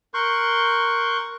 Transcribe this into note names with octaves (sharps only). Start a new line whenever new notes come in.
A#4 C6 C#6 F#6 G6